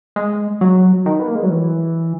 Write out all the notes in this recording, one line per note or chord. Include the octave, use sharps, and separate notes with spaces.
G#3
F#3
D#3
B3
A#3
G#3
F#3
E3